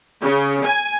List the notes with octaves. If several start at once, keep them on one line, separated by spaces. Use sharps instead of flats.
C#3
G#5